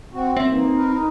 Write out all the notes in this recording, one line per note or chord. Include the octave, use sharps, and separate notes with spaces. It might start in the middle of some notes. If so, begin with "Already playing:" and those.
C4 F#4
F#2 C4 E5
E3 A#3 D#4
A#4 B4
D#4